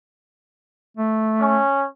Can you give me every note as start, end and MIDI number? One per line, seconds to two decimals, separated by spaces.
0.97 1.61 57
1.41 1.86 61